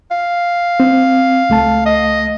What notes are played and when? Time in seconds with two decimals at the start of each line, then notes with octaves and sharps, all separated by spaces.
0.11 F5
0.80 C4
1.50 C#2 A3 A5
1.86 D#5